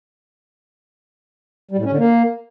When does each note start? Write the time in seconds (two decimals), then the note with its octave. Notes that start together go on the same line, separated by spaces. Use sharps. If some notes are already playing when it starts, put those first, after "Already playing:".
1.71 G3
1.78 A2
1.85 C#4
1.92 D3
1.98 A#3